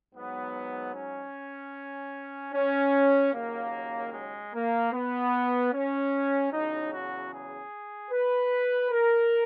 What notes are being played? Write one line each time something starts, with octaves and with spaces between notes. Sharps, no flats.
G#2 F#3 B3
C#4
C#4
D#2 C#3 F#3 A#3
G#3
A#3
B3
C#4
E2 C#3 F#3 D#4
F#4
G#4
B4
A#4